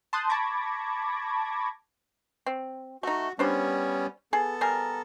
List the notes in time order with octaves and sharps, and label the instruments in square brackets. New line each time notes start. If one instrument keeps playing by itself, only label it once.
[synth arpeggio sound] A5 C6 D#6 F#6 G6
A5 B5 C#6 D6 G#6 A#6
[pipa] C4
[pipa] A3 D#4 [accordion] F#4
[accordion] G3 B3 C#4 [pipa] D4 C5 B5
[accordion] B3 A4 [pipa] G#4
[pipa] G3 G#4 A#4